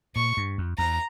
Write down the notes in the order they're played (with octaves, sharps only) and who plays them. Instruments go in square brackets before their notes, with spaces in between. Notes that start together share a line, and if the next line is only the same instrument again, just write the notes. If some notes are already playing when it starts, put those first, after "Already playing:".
[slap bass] A#2 [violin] C#6
[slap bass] G2
F2
[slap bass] E2 [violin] A#5